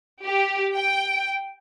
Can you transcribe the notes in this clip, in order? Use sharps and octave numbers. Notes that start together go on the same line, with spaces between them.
G4
G5